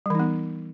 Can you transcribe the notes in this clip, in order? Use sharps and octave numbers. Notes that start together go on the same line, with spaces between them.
E3 G3 B3 D#4